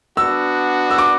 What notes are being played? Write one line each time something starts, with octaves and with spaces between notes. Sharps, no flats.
B3 D4 F#4 E6
E6
D6